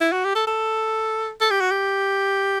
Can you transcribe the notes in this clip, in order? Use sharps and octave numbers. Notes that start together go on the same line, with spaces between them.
E4
F#4
G4
A4
A4
A4
G4
F#4
G4